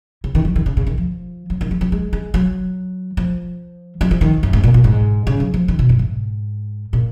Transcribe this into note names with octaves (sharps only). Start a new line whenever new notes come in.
C#3
D#3
F3
D#3
C#3
C#3
D#3
F3
F#3
D#3
F3
F#3
G#3
G#3
F#3
F3
F#3
F3
D#3
F#2
G#2
A#2
A#2
G#2
C#3
F#3
F3
D#3
B2
F#2
G#2
A#2